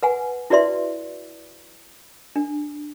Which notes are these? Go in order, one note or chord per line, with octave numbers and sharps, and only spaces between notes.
B4 F#5 G#5
E4 F#4 B4 D5 E5 C6
D4